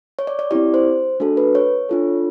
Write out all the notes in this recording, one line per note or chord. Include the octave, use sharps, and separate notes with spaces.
C#5
D5
D5
C4 E4 G4 D5
C5
A3 D4 F#4 A4
B4
C#5
D4 F4 A4